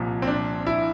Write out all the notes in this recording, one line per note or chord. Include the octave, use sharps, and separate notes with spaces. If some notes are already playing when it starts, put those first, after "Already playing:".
Already playing: C2 A#2 F3
C4
D4
E4